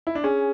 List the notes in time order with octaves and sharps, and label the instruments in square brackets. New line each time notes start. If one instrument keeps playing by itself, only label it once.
[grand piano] E4
D4
[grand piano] C#4 [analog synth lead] G#4